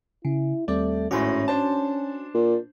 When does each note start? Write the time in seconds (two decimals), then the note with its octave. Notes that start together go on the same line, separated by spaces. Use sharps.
0.25 C#3 E4
0.68 D#2 G3 A3 C4 D5
1.11 G#1 A2 C#4 F#4 G#5 C6
1.48 D4 C5 A5
2.34 A#2